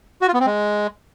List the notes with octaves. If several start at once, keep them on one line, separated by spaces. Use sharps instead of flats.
F#4
F4
B3
C4
G#3